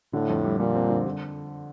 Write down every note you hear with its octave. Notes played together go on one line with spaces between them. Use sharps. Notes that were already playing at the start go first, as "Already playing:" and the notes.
A2 D3
F2
G3
A#2 G3
C4
D3
D3